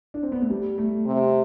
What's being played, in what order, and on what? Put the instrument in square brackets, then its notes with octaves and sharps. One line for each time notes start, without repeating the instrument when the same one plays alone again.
[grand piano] D4
C4
B3
A3
G3
A3
[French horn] C3